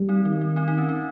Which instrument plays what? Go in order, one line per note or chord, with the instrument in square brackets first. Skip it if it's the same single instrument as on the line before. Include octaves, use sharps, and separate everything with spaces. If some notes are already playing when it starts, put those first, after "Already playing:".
Already playing: [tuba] G3
[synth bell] C4 D#4
[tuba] D#3 [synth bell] C4
[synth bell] C4
C4 D#4
C4 D#4
C#4
C4 D#4